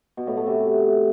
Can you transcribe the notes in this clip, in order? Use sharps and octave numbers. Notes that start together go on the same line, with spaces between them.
B2
A2
A3
C3